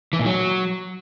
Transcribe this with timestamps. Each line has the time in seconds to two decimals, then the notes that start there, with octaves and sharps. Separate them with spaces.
0.13 E3
0.19 A#2
0.26 F#3